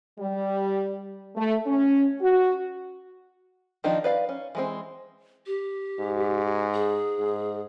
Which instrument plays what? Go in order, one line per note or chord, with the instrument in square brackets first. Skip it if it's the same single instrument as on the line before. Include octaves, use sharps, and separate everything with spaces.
[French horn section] G3
A3
C#4
F#4
[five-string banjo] D#3 F3 D4 D#4
B4 D5 F5
C#4
E3 G#3 C4
[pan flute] G4
[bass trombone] G#2
[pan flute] G#4
[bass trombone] G#2